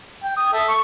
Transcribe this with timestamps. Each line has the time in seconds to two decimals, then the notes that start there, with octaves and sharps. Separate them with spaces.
0.24 G5
0.37 D#6
0.53 A4 E5
0.68 C#6